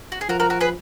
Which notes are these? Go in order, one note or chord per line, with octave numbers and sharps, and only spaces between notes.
F#4
G#4
F3 F#4 A#4
F#4 A#4
F#4 A#4
G#4 B4